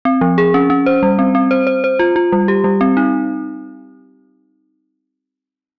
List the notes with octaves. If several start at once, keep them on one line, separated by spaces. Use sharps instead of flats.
C4
F3
G#4
C#4
C#4
C5
G3
C4
C4
C5
C5
C5
F4
F4
G3
G4
G3
C4
D#4